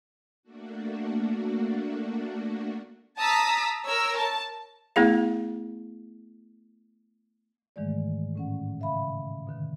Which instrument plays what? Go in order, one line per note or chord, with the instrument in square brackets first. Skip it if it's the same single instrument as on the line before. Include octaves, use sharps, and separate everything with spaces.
[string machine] A3 A#3 D4 F#4
[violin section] A5 A#5 D#6 E6 B6
A#4 C#5 E6
A5
[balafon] A3 B3 E4 G#4 F5
[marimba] G#2 D#3 E3 G#3 A3 D5
A2 C#4 F#5
C#3 E5 F5 B5
B2 D3 D#3